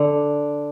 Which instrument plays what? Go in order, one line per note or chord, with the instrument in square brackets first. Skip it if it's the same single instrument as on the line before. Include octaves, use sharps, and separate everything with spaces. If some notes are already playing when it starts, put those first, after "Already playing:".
Already playing: [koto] D3 [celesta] D4 A4 D5